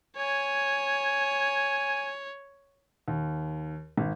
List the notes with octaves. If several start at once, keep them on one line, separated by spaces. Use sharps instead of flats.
C#5 G#5
D#2
G#1